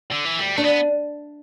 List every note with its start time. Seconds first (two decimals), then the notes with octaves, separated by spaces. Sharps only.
0.11 D3
0.25 E3
0.39 D2 G3
0.56 A3 D4
0.64 B3